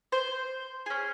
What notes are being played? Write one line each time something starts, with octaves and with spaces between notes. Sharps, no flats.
C5
C#4 G#4